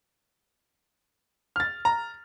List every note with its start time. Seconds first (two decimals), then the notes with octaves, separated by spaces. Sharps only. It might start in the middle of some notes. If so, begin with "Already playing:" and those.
1.56 F6 A6
1.85 A#5